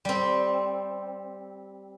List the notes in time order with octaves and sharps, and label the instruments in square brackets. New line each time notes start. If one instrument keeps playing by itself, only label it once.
[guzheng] G3 C4